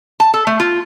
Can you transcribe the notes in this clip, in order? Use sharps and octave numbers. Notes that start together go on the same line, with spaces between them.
A5
A4
A3
F4